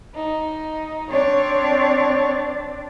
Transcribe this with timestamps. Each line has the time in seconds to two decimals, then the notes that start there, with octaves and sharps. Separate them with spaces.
0.15 D#4
1.10 C4 D4 C#5